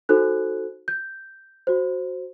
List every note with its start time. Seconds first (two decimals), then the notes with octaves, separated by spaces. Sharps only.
0.09 D#4 F#4 A4 C5 F#6
0.88 G6
1.67 F#4 C5